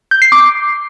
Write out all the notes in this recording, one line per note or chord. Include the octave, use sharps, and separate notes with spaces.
G6
C7
D6